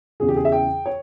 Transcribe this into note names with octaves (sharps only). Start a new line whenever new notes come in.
E2 C#3 E3 G#4
G4
G#4
E5
G5
C#5